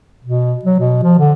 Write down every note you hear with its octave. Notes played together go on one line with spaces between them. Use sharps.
B2
F#3
B2
F3
D3